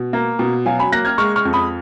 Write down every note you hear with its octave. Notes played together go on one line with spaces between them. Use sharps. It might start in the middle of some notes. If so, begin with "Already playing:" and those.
Already playing: B2
A#3
B2
F#3 F5 G#5
G#5 B5
A#3 F#6 A#6
F6 G#6
G#3 C#6 F6
C#6 F6
F2
B5 D#6